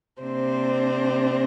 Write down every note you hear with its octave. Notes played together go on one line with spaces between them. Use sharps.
C3 A#3 C4 D4 C5